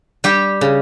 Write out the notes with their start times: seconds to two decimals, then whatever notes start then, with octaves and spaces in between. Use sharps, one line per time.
0.24 G3 G4
0.61 C#3